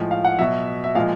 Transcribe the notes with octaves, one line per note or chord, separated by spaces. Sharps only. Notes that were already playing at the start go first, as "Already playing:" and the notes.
Already playing: A2 F3 G#3
F5
F#5
B2 F#3 E5
E5
A#2 F3 G#3 F5